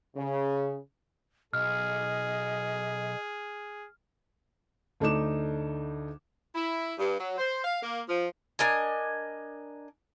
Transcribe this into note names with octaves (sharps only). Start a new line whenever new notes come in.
C#3
B1 G#4 D#5 F6
D2 A3 D4 D#4 D6 E7
E4
G2
F#3
C5
F5
A#3
F3
D4 A#4 D#5 G#5